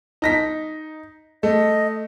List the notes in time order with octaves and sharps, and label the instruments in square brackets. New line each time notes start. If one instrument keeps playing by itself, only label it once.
[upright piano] D#4 A#6 B6
[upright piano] A3 [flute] D#5